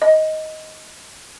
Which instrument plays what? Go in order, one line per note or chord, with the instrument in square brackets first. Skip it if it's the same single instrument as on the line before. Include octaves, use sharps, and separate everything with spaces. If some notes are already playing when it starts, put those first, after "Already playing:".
[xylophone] D#5